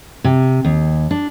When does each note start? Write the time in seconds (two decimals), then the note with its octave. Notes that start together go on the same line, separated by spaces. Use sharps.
0.24 C3
0.65 D#2
1.11 D4